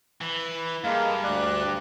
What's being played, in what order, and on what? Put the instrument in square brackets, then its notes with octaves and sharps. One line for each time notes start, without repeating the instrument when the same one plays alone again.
[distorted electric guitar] E3
[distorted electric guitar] G2 [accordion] G#3 A#3 [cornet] F5
[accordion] D2 F#6 [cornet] D5